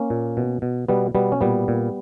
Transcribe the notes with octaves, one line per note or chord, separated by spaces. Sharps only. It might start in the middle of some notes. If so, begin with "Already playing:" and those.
Already playing: A#3 C#4
A#2
B2
B2
B2 G3 B3
B2 G3 B3
C#4
A#2 G3 B3
A#2